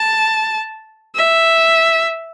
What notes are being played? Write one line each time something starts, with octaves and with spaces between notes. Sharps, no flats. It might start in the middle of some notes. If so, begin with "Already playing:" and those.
Already playing: A5
E5